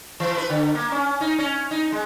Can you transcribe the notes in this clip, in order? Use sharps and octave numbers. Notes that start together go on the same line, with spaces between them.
E3
B4
D3
A#3
C#4
D#4
C#4
D#4
G#3